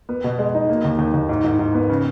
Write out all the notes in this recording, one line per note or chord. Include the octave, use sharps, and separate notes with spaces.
B3
B2
G#3
D#4
A#3
D#2
D#2
D#2
G#2
G#2
G#2
B3
C#3